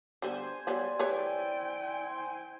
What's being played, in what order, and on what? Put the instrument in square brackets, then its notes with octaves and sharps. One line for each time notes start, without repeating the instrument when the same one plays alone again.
[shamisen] D3 G3 B3 [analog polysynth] C5 G#5
[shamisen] F#3 G3 B3 [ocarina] D5
[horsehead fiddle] E4 G5 [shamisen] G4 B4 C#5